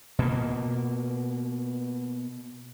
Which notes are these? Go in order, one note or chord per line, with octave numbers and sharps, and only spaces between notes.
B2 A#3